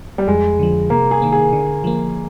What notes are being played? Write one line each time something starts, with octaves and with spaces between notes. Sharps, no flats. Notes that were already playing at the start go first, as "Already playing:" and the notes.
G3
F2 G#3
D3 F3
C3 A#3
G#4
D#3 A#3
G#4
D3
F3 A#3